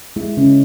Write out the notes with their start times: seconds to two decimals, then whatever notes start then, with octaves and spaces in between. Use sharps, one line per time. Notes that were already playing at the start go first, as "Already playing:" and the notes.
0.16 G#3 E4
0.37 C#3 C#4